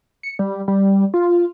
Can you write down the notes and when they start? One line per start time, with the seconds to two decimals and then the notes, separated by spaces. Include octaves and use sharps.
0.23 C#7
0.39 G3
0.68 G3
1.14 F4